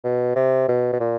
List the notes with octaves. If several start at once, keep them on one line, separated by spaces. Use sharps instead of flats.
B2
C3
B2
B2
A#2